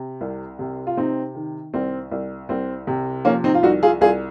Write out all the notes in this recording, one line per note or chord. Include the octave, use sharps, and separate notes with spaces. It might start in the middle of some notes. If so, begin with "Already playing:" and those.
Already playing: C3
C2
C3
F4
C3 C4 D#4
D#3
C2 C4
C2
C2 C4
C3
F3 A#3 C#4
C4 D#4
F4
C2 D#4 F#4
F4 G#4
C2 F4 G#4